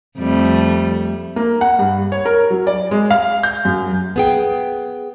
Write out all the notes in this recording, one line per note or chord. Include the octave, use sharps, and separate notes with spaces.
F2 G3 A3
A#3
F#5
G2
C#5
A#4
F#3
D5
G#3
F5
G6
F#2
B3 G#4 G5